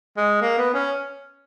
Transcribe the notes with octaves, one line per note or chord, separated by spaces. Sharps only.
G#3
A#3
B3
C#4